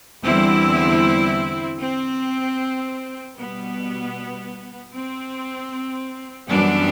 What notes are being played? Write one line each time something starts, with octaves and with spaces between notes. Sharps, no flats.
E2 D3 G3 C4 E4
C4
B2 G3 B3
C4
F#2 E3 G3 B3 D4